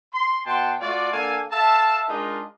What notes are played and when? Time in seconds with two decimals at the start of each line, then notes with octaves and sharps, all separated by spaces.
0.14 C6
0.45 B2 F#5 G5 A5 C6
0.80 A3 F4 F#4 D5
1.12 D3 A#3 A4 F5 G#5
1.52 A4 E5 F5 A5
2.09 G#3 D4 D#4 F4 A#4 D#5